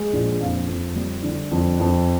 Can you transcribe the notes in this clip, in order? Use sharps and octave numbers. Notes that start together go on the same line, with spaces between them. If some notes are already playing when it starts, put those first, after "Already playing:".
Already playing: G#3
A#1
F2 F5
F2
G3
D3
F2
F2